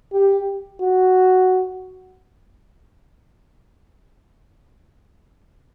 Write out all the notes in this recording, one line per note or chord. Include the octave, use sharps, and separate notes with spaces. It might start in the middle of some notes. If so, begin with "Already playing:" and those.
G4
F#4